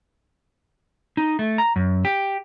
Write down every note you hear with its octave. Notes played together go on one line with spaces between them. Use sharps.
D#4
A3
A#5
F#2
G4